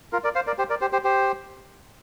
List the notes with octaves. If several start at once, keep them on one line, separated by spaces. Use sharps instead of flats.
F4 A#4
A#4 D5
C5 F5
A#4 D5
G4 C5
A#4 D5
G4 C5
G4 C5
G4 C5